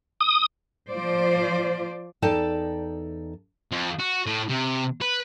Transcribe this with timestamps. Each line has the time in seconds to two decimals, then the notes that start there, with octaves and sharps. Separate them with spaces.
0.21 D#6
0.90 F3 F4 C5 D5
2.22 E2 D#4 A4 D5 G5 A5
3.72 F2
4.00 F#4
4.26 A2
4.49 C3
5.02 B4